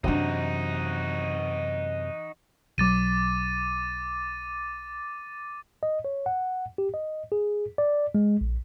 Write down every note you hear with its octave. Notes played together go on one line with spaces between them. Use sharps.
F#2 C3 E3 D4 D#4 F#4
B1 F#3 D6 A6 D#7
D#5
C#5
F#5
G4
D#5
G#4
D5
G#3
A#1